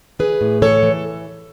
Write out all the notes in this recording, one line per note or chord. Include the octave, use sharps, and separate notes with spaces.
E3 G#4 B4
A2
E3 A4 C#5
E3